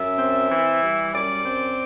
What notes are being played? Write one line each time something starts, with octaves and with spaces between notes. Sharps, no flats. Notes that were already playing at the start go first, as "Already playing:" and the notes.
Already playing: F#2 E5
C4
E3
G3
F#2 D5
C4